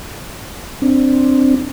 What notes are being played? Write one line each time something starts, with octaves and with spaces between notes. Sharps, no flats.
C4 D4